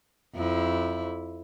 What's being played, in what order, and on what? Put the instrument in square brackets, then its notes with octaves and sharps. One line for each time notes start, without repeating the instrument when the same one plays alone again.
[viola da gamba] F2 E4